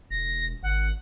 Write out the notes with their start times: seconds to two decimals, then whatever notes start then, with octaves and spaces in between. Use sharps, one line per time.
0.11 E1 A#6
0.63 G#1 F#5